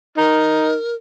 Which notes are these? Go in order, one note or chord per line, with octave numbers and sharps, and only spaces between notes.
D#4 A#4